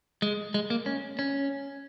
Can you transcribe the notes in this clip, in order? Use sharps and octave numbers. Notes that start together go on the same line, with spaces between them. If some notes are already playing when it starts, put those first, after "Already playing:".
G#3
G#3
A#3
C#4
C#4